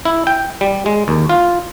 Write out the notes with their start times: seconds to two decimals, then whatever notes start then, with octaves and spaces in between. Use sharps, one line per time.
0.05 E4
0.27 G5
0.61 G3
0.86 G#3
1.08 D#2
1.29 F4